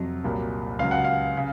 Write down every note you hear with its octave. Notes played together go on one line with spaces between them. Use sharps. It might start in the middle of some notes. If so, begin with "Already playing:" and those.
Already playing: F2 C3 F#3
C2 A#2 F#3
C#2 C#3 F#3 F5
F#5
F5
C#3